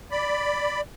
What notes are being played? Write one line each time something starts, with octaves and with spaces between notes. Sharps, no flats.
D5 B5